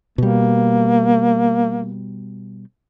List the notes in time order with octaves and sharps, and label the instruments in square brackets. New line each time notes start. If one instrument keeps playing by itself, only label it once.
[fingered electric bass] B2 G3 [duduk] A#3